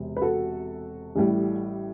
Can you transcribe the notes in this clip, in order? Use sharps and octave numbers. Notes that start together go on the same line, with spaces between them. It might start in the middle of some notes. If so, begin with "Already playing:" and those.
Already playing: E1 C3
B4
F#4 A4
A1 A2 G3